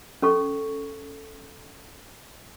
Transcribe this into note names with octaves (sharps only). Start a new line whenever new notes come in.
C#4 A4 C#6